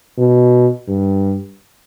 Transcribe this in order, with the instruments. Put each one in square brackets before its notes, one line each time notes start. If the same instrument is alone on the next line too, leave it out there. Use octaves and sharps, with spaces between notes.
[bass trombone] B2
G2